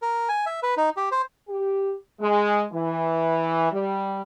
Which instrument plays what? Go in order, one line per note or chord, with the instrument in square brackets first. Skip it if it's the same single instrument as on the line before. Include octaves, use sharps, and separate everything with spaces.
[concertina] A#4
G#5
E5
B4
D#4
G4
C5
[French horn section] G4
G#3
E3
G3